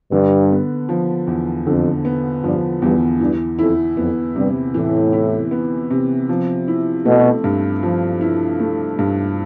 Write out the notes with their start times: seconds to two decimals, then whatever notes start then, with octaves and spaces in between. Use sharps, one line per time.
0.12 G2 D3
0.51 B3
0.89 F3
1.27 E2
1.66 F2 D3
2.05 B3
2.43 G2 F3
2.82 E2 G2
3.20 G2 E3
3.59 F2 E4
3.97 F2 B3
4.36 G2 C3
4.74 A2 E3
5.13 E4
5.51 B3
5.91 C3
6.29 F3
6.68 E4
7.05 B2 A3
7.44 G2
7.83 F3
8.21 E4
8.60 A3
8.99 G2